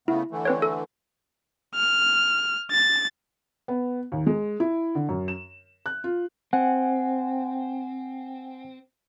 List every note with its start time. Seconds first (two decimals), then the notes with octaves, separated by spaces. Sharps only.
0.08 C#3 A3 B3 E4
0.31 D3 E3 A3
0.45 C4 B4 C#5
0.62 A4
1.75 F6
2.72 A6
3.68 B3
4.12 D#2
4.27 G#3
4.60 E4
4.95 D3
5.09 F#2
5.28 E7
5.86 F#6
6.04 F4
6.53 C4 F#5 G#5